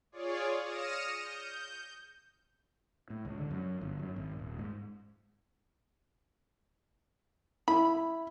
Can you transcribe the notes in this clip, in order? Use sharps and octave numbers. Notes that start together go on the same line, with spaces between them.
F4 G#4 C#5 D5
D#6 F6 A#6 C#7 D#7 E7
G6
A2
C#2
D3
F#2
G1
F#2
G#1
D#1
G#2
E4 B5